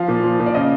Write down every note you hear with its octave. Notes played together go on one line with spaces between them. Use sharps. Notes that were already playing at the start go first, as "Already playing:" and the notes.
Already playing: F3 F5
A#2
F3
A#2
D5
C#3 D#5